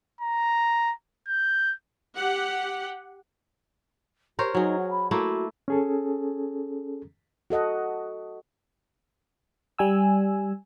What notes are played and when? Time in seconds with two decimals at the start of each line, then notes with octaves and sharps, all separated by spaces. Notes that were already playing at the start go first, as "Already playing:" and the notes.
0.21 A#5
1.28 G6
2.15 G4 F#5
4.39 G4 A#4 C5 C#5
4.54 F#3 D#4 G#4
4.79 F#5
4.91 B5
5.11 A3 A#3 E4 F#4
5.68 C#4 G#4 A4
7.50 F#4 A4 D#5 F#5
9.78 G3 G#5 E6